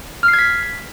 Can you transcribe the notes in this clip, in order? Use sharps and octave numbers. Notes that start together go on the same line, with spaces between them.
F6
C7
G#6
B6